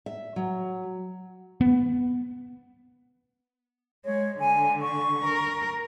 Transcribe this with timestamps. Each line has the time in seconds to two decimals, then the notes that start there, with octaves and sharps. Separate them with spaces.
0.06 E5
0.36 F#3
1.61 B3
4.05 G#3 C#5
4.39 D3 G#5
4.82 C#6
5.24 A#4